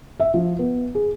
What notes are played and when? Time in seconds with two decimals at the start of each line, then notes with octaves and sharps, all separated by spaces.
0.20 E5
0.34 F3
0.59 B3
0.95 G#4